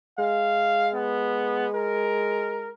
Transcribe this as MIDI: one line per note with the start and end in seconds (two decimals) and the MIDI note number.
0.19 2.72 56
0.19 0.89 77
0.94 1.67 59
1.75 2.70 70